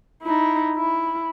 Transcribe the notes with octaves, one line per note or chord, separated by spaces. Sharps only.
D#4 E4
E4